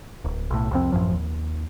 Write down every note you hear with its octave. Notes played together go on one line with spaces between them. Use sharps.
D1
B1 A2
C2 F2 C4
A1 F#2 F3
D#2